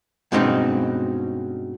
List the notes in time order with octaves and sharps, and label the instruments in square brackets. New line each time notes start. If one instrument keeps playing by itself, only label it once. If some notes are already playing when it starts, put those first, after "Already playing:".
[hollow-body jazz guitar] G2 B2 G#3 C4 C#4 D#4